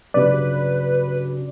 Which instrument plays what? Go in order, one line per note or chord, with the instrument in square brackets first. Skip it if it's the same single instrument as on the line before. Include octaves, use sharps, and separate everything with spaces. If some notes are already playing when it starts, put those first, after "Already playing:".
[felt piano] G2 C#3 F#3 [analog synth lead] B4 [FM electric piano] D5